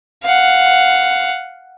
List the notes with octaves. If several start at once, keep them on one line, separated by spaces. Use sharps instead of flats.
F5 F#5